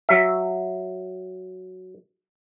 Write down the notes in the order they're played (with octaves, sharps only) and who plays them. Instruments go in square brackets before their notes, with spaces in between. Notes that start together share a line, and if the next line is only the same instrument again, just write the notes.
[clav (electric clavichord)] F#3 E5